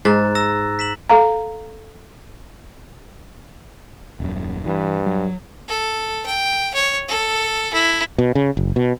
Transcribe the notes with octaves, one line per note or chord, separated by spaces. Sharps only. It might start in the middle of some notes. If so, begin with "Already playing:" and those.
G#2 A#5 F#6 A6
A#5 E6 A#6
B6 E7 F#7
A4 F5 A#5
D#1 F#2
G2 E3
F#3
A4
G5
C#5
A4
E4
B2
C#3
F#1
B2